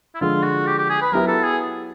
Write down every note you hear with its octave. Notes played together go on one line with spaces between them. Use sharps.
E4
D3 F3 G#3 F4
F#4
G4
G4
G#4
B4
F#3 B3 E4 G4 A#4 B4
A4
G#4